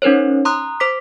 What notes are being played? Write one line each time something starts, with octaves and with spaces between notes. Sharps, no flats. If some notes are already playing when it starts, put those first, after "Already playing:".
C#4 D#4 A#4 C5 C#5
A#5 C6 D#6 F#6
C5 D6 B6